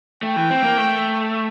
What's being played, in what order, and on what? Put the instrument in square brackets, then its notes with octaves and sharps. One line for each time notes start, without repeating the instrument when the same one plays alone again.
[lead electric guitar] A3 [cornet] G5
[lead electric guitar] E3
C4
A#3
A3